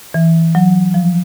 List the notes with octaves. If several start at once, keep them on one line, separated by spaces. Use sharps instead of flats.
E3
F#3
F3